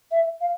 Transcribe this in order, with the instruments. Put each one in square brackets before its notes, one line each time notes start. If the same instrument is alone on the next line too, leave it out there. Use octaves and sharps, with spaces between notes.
[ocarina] E5
F5